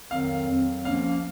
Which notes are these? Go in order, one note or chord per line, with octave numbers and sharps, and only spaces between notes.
F2 D#3 F#3 C4 F5
F2 D#3 F#3 C4
F3 A#3 C#4 F5